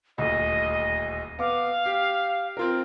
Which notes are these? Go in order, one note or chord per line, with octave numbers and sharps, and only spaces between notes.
D#1 D2 D#5
B3 F5 D6
G4
C4 F4 A#4